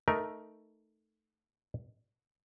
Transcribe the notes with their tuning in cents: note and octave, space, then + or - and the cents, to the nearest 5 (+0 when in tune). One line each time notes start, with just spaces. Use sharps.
A3 +0 D#4 +0 A#4 +15